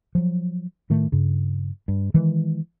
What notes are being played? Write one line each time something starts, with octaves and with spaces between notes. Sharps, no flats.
F3 F#3
A2 D#3 A3
G2 C#3
G2
D#3 E3 G#3